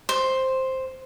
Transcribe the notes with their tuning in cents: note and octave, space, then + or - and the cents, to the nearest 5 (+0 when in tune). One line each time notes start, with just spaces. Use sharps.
C5 +5